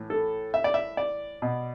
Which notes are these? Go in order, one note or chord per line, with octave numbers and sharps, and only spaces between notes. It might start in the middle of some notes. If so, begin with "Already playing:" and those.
Already playing: A2 E3
A4
E5
D5
E5
D5
B2